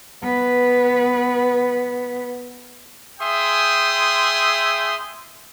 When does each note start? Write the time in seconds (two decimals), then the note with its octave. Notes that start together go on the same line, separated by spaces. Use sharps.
0.23 B3 B4
3.20 G#4 E5 G5 C6 D#6